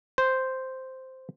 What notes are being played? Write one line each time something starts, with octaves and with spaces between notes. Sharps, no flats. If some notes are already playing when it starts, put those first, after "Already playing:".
C5